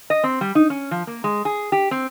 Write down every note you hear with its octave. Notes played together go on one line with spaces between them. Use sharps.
D#5
C4
G3
D#4
C#4
F3
A#3
G#3
G#4
G4
C4